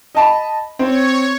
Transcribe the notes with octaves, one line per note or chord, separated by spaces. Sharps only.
D#5 A5 B5
C4 C#5